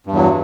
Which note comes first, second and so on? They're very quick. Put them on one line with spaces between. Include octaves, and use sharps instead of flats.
G2 E2 F#3